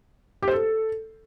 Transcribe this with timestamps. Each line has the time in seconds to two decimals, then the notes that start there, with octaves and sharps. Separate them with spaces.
0.42 G4
0.48 C5
0.53 A4